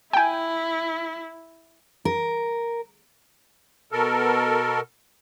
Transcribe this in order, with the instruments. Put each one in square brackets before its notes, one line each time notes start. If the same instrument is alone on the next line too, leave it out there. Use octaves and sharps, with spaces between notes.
[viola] E4 [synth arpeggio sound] G5 G#5
[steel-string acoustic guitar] A#4
[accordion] B2 A4 A#4